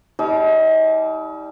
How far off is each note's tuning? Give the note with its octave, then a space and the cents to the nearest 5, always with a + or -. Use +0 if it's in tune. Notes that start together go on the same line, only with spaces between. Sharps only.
G3 +0 D#4 +40 A5 -45